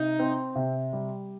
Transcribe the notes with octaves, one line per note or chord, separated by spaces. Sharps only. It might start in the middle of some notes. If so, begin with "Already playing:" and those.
Already playing: C3 D#4
C4
C3
G3